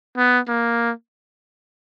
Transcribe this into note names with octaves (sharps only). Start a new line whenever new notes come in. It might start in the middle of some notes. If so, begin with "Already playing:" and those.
B3
A#3